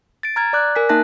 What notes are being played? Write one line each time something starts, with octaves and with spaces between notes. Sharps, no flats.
A6 D7
A#5 F6 G#6 A6
D5 D6 F#6
A#4 G#5 B6
A#3 D#4 E5 A5 F#6 A#6